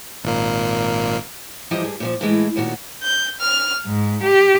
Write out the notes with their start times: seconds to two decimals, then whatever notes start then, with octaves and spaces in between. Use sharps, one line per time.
0.24 G#1 A#2 A#3
1.71 G2 E3 F3 D#4 G4 D#5
1.84 G2 G#4
2.00 A#2 E3 F3
2.21 A2 E3 G#3
2.56 D#2 A#2 D#3 F#4
3.03 G6
3.40 F6
3.87 G#2
4.22 G4